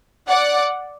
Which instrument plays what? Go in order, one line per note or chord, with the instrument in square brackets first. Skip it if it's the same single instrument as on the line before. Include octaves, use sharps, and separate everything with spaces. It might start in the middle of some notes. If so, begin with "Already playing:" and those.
[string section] D5 F#5